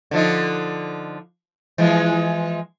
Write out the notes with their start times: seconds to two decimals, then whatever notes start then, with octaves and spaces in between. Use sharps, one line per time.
0.11 D3 F3 D#4
1.78 E3 F3 G#3